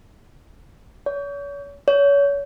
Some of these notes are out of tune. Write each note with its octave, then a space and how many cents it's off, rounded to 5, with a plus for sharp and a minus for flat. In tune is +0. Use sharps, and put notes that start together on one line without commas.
C#5 +40
C#5 +30